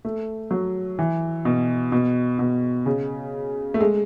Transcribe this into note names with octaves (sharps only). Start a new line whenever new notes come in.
A3
F#3
E3
B2
B2
B2
C#3
A3
G#3